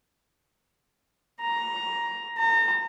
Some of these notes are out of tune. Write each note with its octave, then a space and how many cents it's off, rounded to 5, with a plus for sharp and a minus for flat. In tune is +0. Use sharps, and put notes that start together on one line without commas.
A#5 +10
A#5 -35